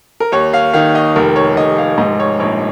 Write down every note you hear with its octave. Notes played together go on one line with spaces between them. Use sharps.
A#4
D#2 C#5
F5
D#3 F5
D#5
F1 A#4
C#5
F1 D#5
F5
G#2 D#5
C#5
A#1 C#5